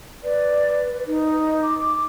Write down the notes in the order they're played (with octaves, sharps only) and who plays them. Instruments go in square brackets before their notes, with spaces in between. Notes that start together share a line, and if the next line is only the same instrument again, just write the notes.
[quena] B4 [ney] D5
[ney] D#4
[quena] D6